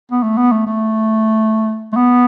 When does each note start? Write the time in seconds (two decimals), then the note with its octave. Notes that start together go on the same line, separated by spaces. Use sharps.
0.12 B3
0.23 A3
0.37 B3
0.52 A3
0.66 A3
1.92 A3
1.96 B3